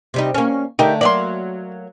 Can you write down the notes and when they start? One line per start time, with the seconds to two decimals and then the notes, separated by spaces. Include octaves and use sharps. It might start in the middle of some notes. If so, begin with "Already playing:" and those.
0.14 C3 G3 D#4
0.34 A#3 C#4
0.79 D3 A3 D#4 G4 A#4
1.01 F#3 A#3 D5 C6